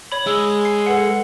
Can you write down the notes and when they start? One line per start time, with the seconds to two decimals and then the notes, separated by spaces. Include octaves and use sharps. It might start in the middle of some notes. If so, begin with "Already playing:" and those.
0.12 C#5 B5
0.27 G#3 E6
0.65 C7
0.86 A4 B4 F#5